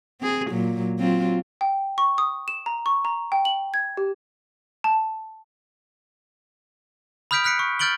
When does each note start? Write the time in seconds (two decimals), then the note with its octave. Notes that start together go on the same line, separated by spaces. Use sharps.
0.21 C4 G#4
0.50 A#2 F#3
0.99 F#3 C4 F4
1.61 G5
1.98 C#6
2.18 D#6
2.48 E7
2.66 A#5
2.86 C#6
3.05 A#5
3.32 G5
3.45 F#7
3.74 G#6
3.97 G4
4.84 A5
7.31 B5 D#6 F6 G6 B6 D7
7.44 F6 F#6 B6 C#7 D7
7.59 C#6
7.79 F6 G6 A6 D7 F#7 G7